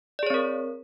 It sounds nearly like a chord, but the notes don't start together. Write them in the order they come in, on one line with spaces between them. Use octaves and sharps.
D5 G#4 C#5 C4 A#4